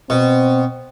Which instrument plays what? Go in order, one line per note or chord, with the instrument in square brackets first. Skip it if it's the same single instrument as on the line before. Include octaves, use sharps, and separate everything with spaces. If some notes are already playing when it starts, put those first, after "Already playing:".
[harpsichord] B2 [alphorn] C4